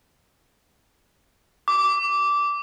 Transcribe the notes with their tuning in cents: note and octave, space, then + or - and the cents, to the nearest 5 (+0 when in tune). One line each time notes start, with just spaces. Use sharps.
D6 -15